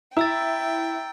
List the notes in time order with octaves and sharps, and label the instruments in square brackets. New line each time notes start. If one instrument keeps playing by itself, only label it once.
[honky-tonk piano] E4 [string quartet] G5 [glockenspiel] A#5 E6 A6